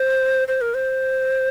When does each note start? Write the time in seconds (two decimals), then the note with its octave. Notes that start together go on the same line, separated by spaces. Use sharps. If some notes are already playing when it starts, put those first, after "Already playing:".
Already playing: C5
0.48 C5
0.61 A#4
0.74 C5